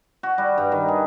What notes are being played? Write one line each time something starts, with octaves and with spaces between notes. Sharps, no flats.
F#4
G3
G2
D#3
G#4